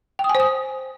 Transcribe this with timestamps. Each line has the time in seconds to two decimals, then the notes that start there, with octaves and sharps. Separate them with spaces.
0.19 G5
0.24 D#6
0.29 G#5
0.35 C5
0.40 D#6